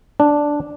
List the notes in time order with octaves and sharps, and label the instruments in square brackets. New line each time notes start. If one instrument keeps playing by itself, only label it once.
[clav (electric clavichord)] D4